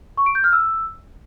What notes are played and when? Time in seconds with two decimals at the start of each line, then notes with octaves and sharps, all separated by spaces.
0.17 C#6
0.26 D7
0.35 G6
0.44 F6
0.53 E6